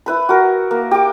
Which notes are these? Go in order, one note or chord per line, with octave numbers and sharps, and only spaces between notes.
E4 B4 B5
F#4 A#4
A#3
G4 D6